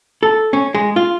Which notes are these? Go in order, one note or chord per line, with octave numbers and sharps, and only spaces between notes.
A4
C#4
G#3
F4